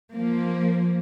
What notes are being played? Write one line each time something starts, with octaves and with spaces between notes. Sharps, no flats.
F3 A#3